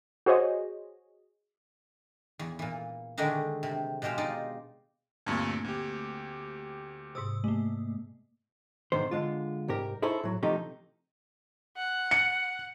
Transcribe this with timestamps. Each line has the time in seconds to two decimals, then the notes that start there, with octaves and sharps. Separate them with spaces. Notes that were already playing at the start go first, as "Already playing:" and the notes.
0.26 F#4 G#4 C5 C#5 D#5
2.39 E2
2.59 A#2 E3
3.18 D3 D#3 G#3 A3 D4 D#4
3.63 C3
4.02 B2 G#3 G4 C5 F5
4.18 D#4 F4 D5 D#5
5.26 D2 G2 A#2 A3 A#3 C4 G#6
5.64 D2 G4
7.15 G#2 C3 D#6 E6
7.44 A3 A#3
8.92 B1 G#2 D3 D#3 C5
9.11 D3 G#3 F4
9.68 C2 G#2 G4 A#4
10.02 D#4 E4 G#4 A4 C5 C#5
10.23 A2 F#3
10.43 C3 E3 F3 A3 D#4 G4
11.77 F#5
12.11 C#7